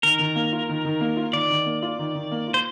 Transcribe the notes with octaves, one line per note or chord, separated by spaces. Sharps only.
D#3 A#4
D#3
A#3
F4
D#3
D#3
A#3
F4
D#3 D5
D#3
A#3
F4
D#3
D#3
A#3
F4
C5